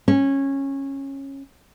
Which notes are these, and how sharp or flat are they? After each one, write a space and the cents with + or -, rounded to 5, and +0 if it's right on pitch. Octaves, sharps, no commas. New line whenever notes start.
C#4 -15